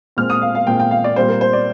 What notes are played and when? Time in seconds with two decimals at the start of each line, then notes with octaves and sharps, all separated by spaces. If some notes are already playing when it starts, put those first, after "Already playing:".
0.17 A#2 G#3 C4 F6
0.30 D#6
0.42 F5
0.55 F5
0.67 A#2 G#3 C4 G5
0.80 G5
0.91 F5
1.04 D5
1.16 A#2 G3 C4 C5
1.28 A#4
1.41 C5
1.53 D5